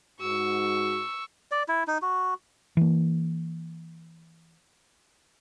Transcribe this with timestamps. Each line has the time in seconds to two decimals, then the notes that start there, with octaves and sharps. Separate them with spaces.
0.21 G#2 F#4 C#6 E6
1.51 D5
1.68 E4
1.88 D#4
2.02 F#4
2.77 E3 A#3